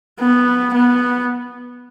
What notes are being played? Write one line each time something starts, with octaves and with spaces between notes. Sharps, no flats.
B3
B3